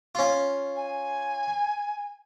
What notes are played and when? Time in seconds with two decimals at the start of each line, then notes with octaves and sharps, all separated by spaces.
0.15 C#4 F4
0.75 G#5